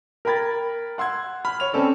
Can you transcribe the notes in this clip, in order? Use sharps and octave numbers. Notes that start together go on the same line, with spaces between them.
A#4 G5 A#5 B5 G#6 A6
F#5 C6 E6 G#6
B5 F6
C#5 F7
C4 C#4 A4 D5